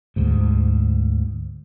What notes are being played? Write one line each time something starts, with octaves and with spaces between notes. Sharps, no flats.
D2 G#2